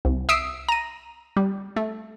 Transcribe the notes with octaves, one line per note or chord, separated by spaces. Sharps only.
C2
E5 D#6 E6 C7 D7
A#5 D#7
G3
A3